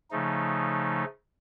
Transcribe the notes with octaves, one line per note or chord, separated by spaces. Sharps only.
C#3 F3 A3 D#4